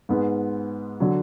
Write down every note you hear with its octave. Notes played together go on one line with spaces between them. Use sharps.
G#2 G#3 B3
D3 F#3